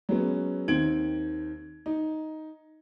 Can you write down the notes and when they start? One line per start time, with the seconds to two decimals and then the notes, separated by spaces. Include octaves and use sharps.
0.09 F#3 G#3 B3 C#4
0.68 D#2 D#3 C4 G#6 D7 F#7
1.86 D#4